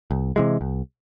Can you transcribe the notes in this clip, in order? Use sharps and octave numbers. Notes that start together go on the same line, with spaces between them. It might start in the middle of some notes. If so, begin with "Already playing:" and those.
C2
C3 E3 G#3
C2